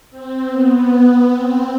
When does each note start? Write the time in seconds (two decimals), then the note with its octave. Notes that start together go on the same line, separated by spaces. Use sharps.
0.10 C4
0.50 B3
1.28 C4